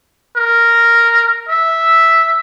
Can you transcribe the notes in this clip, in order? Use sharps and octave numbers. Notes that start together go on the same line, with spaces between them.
A#4
E5